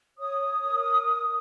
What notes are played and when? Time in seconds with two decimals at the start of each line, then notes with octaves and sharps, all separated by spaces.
0.17 C#5 D#6
0.40 C#5
0.64 A#4